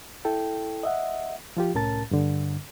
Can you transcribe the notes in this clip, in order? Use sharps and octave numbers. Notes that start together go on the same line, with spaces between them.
E4 A4 G5
D#5 E5 F#5
F3 F4 G4
C2 A2 C#4 A#4 A5 A6
G2 D3